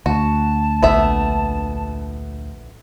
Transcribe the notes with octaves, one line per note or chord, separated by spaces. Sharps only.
D2 F#4 A5
A#1 A3 B3 E5